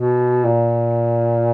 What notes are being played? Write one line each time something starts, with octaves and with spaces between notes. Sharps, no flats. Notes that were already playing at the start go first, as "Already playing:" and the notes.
Already playing: B2
A#2